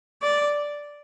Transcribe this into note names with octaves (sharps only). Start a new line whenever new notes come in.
D5